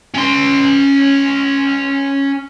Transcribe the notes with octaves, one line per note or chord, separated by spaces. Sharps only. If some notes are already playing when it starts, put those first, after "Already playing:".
C#4 C6